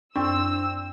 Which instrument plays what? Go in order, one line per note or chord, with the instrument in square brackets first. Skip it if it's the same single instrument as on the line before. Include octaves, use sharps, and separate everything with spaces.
[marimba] F#2 C6 C#6 [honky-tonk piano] C4 [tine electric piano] D4 [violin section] E6